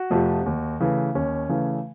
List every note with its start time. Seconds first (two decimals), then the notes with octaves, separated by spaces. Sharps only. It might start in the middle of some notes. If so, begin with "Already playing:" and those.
Already playing: F#4
0.10 F2 C3 F3 A3
0.46 D#2
0.80 C#3 E3 A3
1.15 D#2 C#4
1.49 C#3 E3 A3